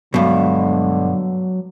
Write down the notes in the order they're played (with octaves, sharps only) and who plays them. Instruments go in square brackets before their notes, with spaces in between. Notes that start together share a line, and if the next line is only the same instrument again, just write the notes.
[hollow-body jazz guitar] G2 B2 [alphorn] D3 [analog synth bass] F#3 [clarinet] G#3